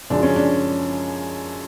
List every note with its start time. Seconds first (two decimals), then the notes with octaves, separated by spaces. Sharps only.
0.10 F#2 C#3 F3 G#3 D4
0.23 C#4
0.36 D4